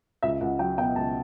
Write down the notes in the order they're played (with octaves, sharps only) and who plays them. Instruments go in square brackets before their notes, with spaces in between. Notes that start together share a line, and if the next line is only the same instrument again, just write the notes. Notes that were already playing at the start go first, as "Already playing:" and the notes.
[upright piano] C#2 E5
C#2 F#5
F#3 G5
B2 G5
C#2 A5